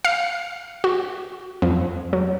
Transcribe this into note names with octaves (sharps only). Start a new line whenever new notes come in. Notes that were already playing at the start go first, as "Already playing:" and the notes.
F5
F#4
F2
F#3